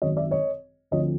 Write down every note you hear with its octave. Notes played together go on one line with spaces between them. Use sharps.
G#1 F#2 D#3 C#5 D#5
D5 E5
C#5 D#5
D2 D3 F3 A3 C4 C#5 D#5